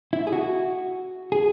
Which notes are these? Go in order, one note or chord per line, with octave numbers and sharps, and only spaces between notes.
E4
G#4
F#4
G#4